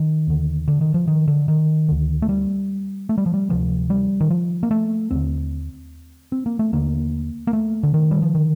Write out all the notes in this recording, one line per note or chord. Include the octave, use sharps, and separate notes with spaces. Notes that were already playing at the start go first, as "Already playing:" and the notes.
Already playing: D#3
D#2 D3
D3
D#3
F3
D#3
D3
D#3
D2 D3
A3
G3
A3
G3
F3
G3
D2 C3 F3
G3
D#3
F3
A#3
A3
D#2 D3 C4
C4
A#3
A3
D#2 D3 A#3
A#3
A3
D3
D#3
G3
F3
D3 D#3